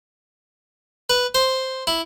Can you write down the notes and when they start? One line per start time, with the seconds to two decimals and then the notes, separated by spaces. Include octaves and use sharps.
1.10 B4
1.35 C5
1.87 E4